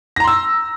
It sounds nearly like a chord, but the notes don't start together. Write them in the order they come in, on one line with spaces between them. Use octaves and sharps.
A#6 A#5 C6 E6